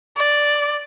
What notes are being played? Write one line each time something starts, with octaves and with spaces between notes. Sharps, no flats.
D5